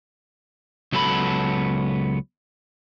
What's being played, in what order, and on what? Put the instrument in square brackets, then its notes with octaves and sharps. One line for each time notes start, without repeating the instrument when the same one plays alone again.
[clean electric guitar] C#2 F#3 B3 A4 A5 B5